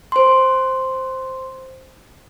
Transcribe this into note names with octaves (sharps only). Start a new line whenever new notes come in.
C5 C6